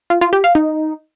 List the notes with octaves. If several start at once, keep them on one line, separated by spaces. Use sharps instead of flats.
F4
F4
G4
F5
D#4